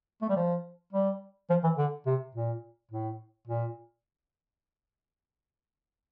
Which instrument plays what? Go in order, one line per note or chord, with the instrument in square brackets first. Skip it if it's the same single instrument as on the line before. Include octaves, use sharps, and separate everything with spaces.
[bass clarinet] A3
G3
F3
G3
F3
E3
D3
C3
A#2
A2
A#2